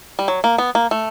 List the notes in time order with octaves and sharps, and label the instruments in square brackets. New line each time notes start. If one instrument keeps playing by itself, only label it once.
[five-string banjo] G3
F#3
A#3
B3
A#3
A3